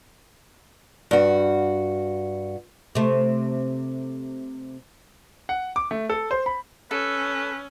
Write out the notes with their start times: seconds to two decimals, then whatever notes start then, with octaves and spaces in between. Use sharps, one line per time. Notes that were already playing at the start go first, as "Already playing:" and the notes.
1.11 G2 F#4
2.95 C3 A3
5.49 F#5
5.76 D6
5.91 A3
6.10 A4
6.31 C5
6.46 B5
6.91 C#4 A4 B4